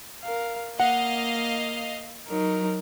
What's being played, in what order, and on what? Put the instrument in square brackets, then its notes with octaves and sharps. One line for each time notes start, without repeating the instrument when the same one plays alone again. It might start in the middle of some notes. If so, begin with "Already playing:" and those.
[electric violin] A#4 F5
[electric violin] A#3 [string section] D#5 F5 [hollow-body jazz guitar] F#5
[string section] F#3 [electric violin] D#4 A#4